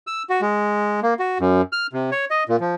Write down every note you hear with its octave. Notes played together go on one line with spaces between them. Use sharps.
E6
F#4
G#3
A#3
F#4
F#2
F6
C3
C#5
D#5
A#2
F3